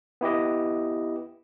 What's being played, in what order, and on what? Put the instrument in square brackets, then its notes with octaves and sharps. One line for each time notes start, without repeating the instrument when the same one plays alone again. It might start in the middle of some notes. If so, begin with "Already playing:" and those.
[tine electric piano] B3 E4 G4 D#5